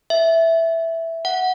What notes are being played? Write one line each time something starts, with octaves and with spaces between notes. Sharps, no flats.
E5
F#5